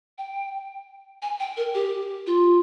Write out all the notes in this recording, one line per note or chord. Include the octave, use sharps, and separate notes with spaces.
G5
G#5
G5
A#4
G4
F4